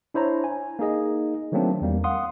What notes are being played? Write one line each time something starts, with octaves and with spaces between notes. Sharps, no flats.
D4 E4 C5 C#5 A#5
G#5
A#3 D#4 G#4 D#5
D#3 F#3 A3 A#3 C4 D4
E2 G3 A#3
F5 F#5 C6 D#6